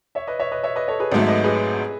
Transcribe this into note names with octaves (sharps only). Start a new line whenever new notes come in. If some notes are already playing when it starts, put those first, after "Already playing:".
C#5 E5
B4 D#5
C#5 E5
B4 D#5
C#5 E5
B4 D#5
A4 C#5
G#4 B4
G#1 G#2 F#3 A3 A4 C#5
E5
B4 D#5
G#4 B4